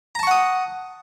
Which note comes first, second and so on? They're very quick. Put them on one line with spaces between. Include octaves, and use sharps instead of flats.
A#5 A5 C#6 F#5 D#6